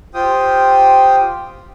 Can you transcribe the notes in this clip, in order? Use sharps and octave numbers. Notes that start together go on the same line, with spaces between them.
F4 G4 C5 G5 D#6